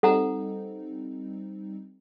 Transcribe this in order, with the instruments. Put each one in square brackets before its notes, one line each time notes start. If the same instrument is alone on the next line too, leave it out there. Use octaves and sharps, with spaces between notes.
[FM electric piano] G3 C4 D#4 [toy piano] A4 F#5 A#5